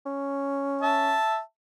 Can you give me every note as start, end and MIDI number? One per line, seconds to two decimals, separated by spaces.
0.06 1.16 61
0.82 1.39 76
0.82 1.39 81